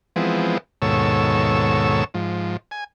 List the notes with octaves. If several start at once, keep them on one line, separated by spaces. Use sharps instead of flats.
E3 F3 G#3 B3 C4
D#2 G#2 B2 A4 C#5 E6
G#2 F3
G#5